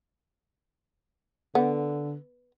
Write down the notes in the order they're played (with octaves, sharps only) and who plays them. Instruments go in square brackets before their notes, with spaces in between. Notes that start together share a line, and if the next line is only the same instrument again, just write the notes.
[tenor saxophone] D3 [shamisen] B3